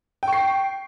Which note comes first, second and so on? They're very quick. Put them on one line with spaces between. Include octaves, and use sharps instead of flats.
G5 C#6 C7